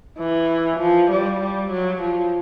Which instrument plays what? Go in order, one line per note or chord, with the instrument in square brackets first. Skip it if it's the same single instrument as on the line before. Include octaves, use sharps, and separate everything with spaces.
[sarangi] E3
F3
G3
G3
F#3
F3